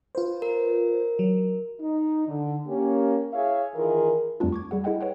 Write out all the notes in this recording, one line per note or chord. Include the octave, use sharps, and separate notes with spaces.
F4 B4 C5
A#4
F#3
D#4
D3
A#3 C#4 G4
E4 G#4 C#5 E5 F5
D#3 E3 F4 G#4 A#4
F2 G3 A3 C4 D4 F4
C#6 D6 G#6
G3 G#4 F#5
E4 G#4 D#5 F#5 G5
B4 C#5 F#5 G5